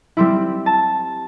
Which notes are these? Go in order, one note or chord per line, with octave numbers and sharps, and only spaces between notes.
G3 C4 E4
A5